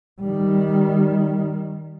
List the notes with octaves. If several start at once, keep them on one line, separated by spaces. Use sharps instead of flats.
D#3 G3